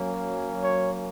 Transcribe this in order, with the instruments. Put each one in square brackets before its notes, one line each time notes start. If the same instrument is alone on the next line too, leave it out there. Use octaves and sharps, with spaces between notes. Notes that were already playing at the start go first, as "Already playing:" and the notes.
Already playing: [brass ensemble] F#3 A#3 C#4
[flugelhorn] C#5